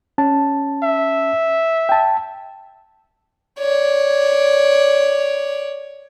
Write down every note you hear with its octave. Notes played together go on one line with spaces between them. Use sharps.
C#4 A5
E5
G5 A5
C#5 D5